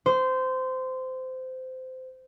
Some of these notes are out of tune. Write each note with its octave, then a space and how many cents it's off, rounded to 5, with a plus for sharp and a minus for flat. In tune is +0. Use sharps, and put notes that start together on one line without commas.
C5 -20